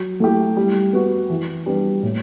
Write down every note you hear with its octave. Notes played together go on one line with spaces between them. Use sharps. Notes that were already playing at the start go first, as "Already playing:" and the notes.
Already playing: F#3
A3 E4 G4
G3
B3 F#4
E3
G3 B3 D4
A2